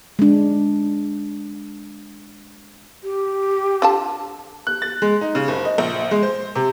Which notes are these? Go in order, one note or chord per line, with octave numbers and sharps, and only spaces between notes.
G#3 D4
G4
D3 F4 A5
F#6
A6
G#3
D#4
C#3
F#1
D#5
A#1
G#3
C5
C3